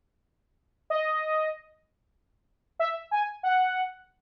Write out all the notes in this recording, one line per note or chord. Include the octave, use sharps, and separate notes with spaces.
D#5
E5
G#5
F#5